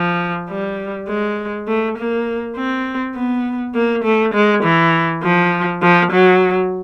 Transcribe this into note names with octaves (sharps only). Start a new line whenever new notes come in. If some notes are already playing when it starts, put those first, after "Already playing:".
Already playing: F3
G3
G#3
A3
A#3
C4
B3
A#3
A3
G#3
E3
F3
F3
F#3